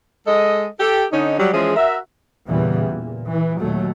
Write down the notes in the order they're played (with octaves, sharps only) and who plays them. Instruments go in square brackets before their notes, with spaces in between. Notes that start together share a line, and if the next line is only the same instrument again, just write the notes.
[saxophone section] G#3 A4 D#5
G4 A4
D3 C#4 D#4
F#3 G3
E3 F3 G#3 C#4 G#4
F#4 A#4 E5
[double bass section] E2 A#2 C#3 E3 G3 B3
A#2
E3
D#2 A#2 F#3 A3